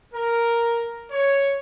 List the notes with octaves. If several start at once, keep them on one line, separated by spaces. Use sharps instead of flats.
A#4
C#5